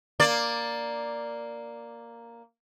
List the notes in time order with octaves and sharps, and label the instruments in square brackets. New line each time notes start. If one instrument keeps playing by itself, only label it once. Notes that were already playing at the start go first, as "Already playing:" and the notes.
[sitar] A#3 D5